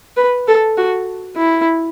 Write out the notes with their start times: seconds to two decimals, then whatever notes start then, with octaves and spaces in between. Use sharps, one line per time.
0.17 B4
0.47 A4
0.77 F#4
1.36 E4